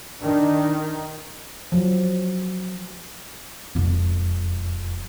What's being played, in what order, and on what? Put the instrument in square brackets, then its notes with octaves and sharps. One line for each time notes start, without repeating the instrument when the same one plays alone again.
[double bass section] D#3 [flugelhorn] D4
[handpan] F3 F#3
[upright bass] E1 F2